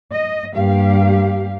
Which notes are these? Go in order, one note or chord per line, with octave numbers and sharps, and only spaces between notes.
D#5
G2 A#3 G4 F5